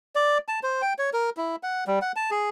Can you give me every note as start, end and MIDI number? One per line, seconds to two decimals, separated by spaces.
0.16 0.38 74
0.48 0.60 81
0.63 0.82 72
0.82 0.93 79
0.98 1.10 73
1.13 1.30 70
1.37 1.56 64
1.63 1.84 78
1.87 1.99 55
2.02 2.12 78
2.16 2.31 81
2.31 2.50 68